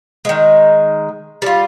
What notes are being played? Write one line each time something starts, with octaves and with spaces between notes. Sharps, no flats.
D#3 G#3
G3 F4